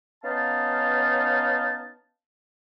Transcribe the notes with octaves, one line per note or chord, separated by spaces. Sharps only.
B3 C#4 D#4 F5 A5